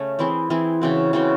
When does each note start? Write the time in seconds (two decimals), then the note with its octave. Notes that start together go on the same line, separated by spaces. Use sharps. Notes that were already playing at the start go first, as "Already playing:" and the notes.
Already playing: C#3 A3 C#4
0.19 E3 C4 E4 G#4
0.50 E3 C4 E4 G#4
0.82 C#3 E3 C4 F#4
1.13 C#3 E3 C4 F#4